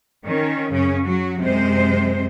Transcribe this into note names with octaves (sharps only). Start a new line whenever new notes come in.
D#3 C#4
F#2 C#3 C#4
F#3 F#4
F#2 C3 G#3 C5